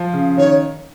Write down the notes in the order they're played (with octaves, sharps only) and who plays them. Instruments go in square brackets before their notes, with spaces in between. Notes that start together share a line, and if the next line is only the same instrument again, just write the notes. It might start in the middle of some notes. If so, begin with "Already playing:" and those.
Already playing: [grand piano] F3
C#3
[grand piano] D#3 [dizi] C#5